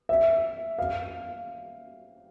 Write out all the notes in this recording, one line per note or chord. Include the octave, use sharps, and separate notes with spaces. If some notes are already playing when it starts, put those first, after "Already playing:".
E5
F5